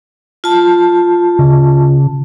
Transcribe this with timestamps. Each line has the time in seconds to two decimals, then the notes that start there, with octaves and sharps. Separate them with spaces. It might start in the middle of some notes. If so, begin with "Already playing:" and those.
0.44 F4 A5
1.39 C#3